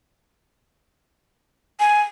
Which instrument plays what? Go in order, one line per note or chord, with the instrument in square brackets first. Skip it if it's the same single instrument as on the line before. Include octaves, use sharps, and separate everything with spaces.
[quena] G#5